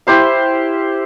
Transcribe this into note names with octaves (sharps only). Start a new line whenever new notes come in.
E4 G4 C5 F5